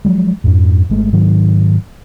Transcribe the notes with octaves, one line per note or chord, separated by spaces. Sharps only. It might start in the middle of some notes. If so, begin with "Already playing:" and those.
F3 F#3 G#3
F2 G#2
G#1 G#3 A3
G#2 D#3 F#3